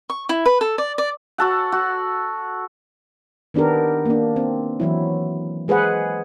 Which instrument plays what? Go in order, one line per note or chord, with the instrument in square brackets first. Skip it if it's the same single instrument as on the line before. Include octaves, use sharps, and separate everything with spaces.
[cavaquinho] C#6
E4
B4
A4
D5
D5
[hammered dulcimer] F#4 A4 F#5
F#4
[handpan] D#3 B3 D4 G4 A#4
A#3 D4
C4
E3 F#3 E4
G#3 G#4 B4 C5 F#5